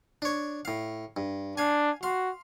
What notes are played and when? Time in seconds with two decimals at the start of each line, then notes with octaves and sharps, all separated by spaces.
0.22 D4 C#5
0.65 A2 F5
1.17 G2
1.57 D4 F5 G#5
2.03 F#4 F5 C6